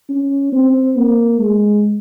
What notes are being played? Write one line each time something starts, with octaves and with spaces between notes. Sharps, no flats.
C#4
C4
A#3
G#3